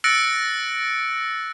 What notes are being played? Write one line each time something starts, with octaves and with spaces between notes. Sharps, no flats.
E6 F#6 A6 A#6 C#7 D7